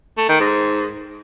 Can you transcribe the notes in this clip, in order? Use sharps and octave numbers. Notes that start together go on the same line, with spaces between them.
A3
D#3
G#2